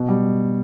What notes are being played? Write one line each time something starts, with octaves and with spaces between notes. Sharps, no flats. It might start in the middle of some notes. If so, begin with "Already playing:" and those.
Already playing: B2
G3